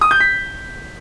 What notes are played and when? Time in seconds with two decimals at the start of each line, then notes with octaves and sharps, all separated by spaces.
0.01 D#6
0.11 G6
0.20 B6